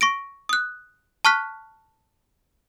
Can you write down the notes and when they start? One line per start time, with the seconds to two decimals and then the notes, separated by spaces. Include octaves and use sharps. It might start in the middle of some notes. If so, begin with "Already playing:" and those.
0.01 C#6 A#6 D7
0.49 D#6 F#6
1.25 A5 C#6 F6 F#6 B6